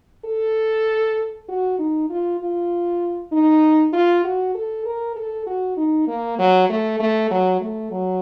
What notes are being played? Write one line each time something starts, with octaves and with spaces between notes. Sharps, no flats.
A4
F#4
D#4
F4
F4
D#4
F4
F#4
A4
A#4
A4
F#4
D#4
A#3
F#3
A3
A3
F#3
A3
F#3